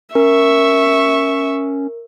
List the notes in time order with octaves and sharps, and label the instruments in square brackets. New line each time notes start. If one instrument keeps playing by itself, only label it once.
[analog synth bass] C#4 [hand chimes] A#4 [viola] E5 C#6